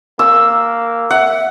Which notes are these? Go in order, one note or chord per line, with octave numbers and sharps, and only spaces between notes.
A#3 E6
E5 F#5